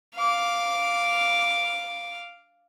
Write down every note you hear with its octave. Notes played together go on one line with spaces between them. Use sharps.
F5 D6